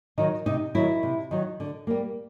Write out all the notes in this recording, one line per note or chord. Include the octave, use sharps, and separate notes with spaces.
D#3 F#3 D#4
C3 D#4
D#3 F#3 E4
C3
D#3 F#3
D3
G3 A#3